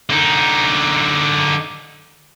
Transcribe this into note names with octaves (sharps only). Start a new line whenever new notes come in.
D3 D#4